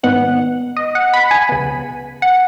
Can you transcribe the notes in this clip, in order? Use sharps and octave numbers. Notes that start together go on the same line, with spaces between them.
G#2 D#3 B3 F#5
D#5
F#5
B5
G#5
C#2 C#3 B3
F#5